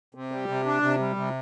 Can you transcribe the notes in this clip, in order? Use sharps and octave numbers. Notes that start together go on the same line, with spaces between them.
C3
G3
C3
D4
C3
G3
C3